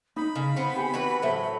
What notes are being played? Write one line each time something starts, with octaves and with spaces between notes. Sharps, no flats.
D#4 B5
C#3
B3 C4
G4 G#5
E3 F#4 B4
A2 F#3 C5 E5